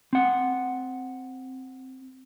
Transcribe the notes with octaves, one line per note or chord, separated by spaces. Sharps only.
C4 F#5